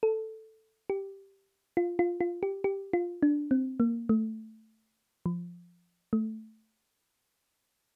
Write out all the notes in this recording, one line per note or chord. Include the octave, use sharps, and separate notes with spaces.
A4
G4
F4
F4
F4
G4
G4
F4
D4
C4
A#3
A3
F3
A3